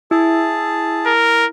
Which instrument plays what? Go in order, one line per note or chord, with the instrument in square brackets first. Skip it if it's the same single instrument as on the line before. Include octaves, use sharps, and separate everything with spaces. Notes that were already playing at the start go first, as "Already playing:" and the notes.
[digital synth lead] E4 [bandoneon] G#4 A5
[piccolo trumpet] A#4